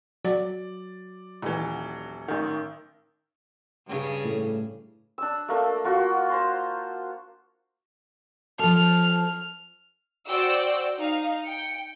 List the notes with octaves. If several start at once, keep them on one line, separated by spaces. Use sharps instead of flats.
F#3 D5
D#1 E3
A1 D#3
G2 C#3
A2
D4 E6
A3 A#3 D4
A#3 F4 F#4
C5 A#5 C6
F3 A4 F6
F#4 C5 D5 G5 E6
D#4 F5
G5 C#7